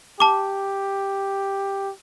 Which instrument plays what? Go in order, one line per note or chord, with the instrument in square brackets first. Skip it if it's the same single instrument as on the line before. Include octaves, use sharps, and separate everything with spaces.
[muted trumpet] G4 [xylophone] A5 D6